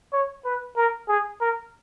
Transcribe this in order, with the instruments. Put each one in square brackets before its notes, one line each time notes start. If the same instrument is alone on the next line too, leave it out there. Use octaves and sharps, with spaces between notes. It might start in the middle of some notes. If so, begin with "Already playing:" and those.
[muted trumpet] C#5
B4
A#4
G#4
A#4